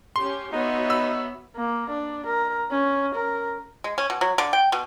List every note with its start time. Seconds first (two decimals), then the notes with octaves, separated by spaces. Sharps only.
0.16 C#4 G4 C6
0.53 B3 D#4 F#4 C#5 E5
0.90 B5 E6
1.56 A#3
1.90 D4
2.26 A#4
2.71 C#4
3.14 A#4
3.84 G#3
3.98 C#4
4.10 B2
4.21 F#3
4.38 D3
4.53 G5
4.72 B2